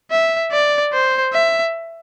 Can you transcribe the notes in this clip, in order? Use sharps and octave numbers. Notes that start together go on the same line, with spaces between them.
E5
D5
C5
E5